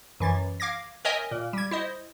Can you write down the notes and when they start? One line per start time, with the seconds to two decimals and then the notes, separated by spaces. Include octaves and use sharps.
0.20 F#2 E3 A6
0.60 F5 D6 G#6 A#6
1.05 A#4 C#5 D#5 E5 G5 G#5
1.31 A#2
1.53 G3 G#6
1.71 E4 C5 D#5